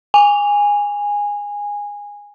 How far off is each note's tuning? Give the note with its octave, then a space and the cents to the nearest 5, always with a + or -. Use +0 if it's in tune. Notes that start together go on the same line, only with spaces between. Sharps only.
G#5 -15